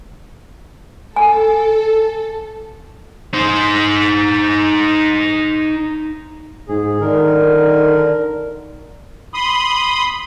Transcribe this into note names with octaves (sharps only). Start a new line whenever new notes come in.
A4 G#5
D#4 C5
G#2 G#4
D3 D#3 A#4
B5 C6 D#6